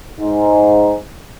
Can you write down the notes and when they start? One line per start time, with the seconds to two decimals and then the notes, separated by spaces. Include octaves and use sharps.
0.19 G#2